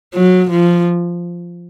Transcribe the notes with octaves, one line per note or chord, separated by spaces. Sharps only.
F#3
F3